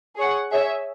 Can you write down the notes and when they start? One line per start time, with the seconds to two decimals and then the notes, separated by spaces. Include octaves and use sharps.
0.17 G#4 C#5 F#5
0.51 G#4 C#5 E5